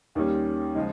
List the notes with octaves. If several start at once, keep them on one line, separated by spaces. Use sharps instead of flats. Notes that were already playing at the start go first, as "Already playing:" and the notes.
D#2 D#3 G3 C#4
C#3 F3 G#3 D#4